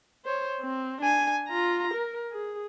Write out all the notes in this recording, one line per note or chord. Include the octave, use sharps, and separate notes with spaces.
C5 C#5
C4
D4 G#5
F4 A#5
A#4
G#4